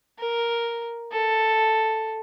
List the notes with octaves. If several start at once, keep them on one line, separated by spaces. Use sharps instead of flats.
A#4
A4